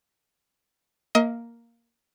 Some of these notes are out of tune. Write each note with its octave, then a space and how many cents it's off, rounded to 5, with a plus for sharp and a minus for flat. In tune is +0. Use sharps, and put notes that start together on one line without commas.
A#3 +0 D#5 +35